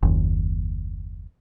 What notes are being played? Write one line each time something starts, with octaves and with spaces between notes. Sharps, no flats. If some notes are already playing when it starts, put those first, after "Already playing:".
F#1 D#2